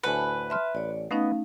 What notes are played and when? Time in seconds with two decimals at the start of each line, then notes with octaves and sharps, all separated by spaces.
0.03 D2 A2 B4 F#5 G#5 A5 B5
0.50 E5 A5 C6 F6
0.75 A1 C#5 D5
1.11 A3 B3 C#4 D#4 D#5 F5